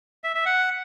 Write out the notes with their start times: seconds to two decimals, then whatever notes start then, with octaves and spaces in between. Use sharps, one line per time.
0.24 E5
0.35 E5
0.46 F#5